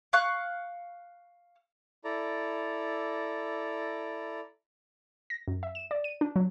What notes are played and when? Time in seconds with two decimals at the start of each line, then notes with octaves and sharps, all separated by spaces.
0.13 F5 C#6 F#6
2.04 E4 A4 D5 A#5
5.30 A#6
5.48 F#2
5.63 E5
5.75 E7
5.91 D5
6.04 D#7
6.21 D4
6.36 F#3